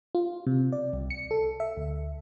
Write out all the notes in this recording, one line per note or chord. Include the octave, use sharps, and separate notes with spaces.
F4
C3
D5
C2
C#7
A4
E5
D2